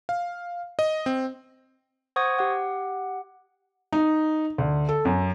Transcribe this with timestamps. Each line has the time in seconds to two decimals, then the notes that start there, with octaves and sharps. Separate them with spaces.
0.09 F5
0.79 D#5
1.06 C4
2.16 C5 F#5 C#6 D#6 G#6 A#6
2.39 G4 F#5
3.93 D#4
4.58 D2
4.89 A4
5.05 F#2